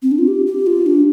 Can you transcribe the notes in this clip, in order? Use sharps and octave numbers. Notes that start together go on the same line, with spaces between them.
C4
D4
F4
G4
G4
F4
D4